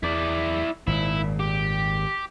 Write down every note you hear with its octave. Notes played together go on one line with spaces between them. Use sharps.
E2 E4 D5
G#1 A#2 E4
G4